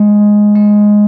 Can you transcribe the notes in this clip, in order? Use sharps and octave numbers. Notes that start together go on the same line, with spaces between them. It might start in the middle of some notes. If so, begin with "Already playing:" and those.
Already playing: G#3
G#3